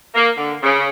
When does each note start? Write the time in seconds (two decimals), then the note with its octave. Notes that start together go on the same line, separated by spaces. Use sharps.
0.15 A#3
0.37 D3
0.63 C#3